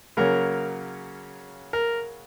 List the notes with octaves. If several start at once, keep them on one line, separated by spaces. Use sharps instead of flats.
C#3 F#3 A#3 C#4 A#4
A#4